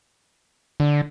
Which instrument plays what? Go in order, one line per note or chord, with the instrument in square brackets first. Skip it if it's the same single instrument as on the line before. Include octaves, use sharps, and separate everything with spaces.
[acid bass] D3